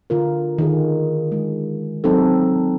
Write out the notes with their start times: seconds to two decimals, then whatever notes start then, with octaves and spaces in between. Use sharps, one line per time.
0.10 D3 F4 A#4
0.58 D#3 G#4
1.32 G#3
2.04 F#3 C4 D#4 A4